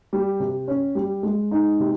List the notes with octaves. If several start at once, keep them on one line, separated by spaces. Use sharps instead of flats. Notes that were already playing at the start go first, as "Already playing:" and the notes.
G3
C3
C#4
G3
G#3
D#4
C3